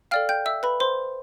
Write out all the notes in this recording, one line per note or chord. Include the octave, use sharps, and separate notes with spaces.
A4 D5 F5 G5 F6
G5 G6
E5 E6
B4 B5
C5 C6